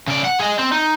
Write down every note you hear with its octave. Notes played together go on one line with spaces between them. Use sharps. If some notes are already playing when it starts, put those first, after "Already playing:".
C#3 D5
F#5
G#4 D#5
C4
D#4